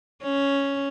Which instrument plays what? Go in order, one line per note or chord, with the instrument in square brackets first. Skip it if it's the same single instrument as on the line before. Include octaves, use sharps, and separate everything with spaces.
[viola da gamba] C#4